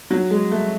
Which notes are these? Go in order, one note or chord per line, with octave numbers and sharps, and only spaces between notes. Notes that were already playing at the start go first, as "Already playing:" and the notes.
F#3
G#3
A3